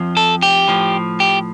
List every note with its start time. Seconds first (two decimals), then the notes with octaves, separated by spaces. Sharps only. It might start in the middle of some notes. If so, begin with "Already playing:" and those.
Already playing: F2 F3
0.17 A4
0.42 G4
0.68 A2 F3
1.20 G4